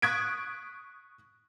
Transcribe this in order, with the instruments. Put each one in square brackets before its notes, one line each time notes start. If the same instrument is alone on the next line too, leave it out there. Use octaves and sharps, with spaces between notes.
[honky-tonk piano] C#6 D#6 F#6 G#6 B6 D7